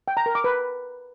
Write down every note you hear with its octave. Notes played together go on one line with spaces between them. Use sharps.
G5
A#5
A#4
D6
B4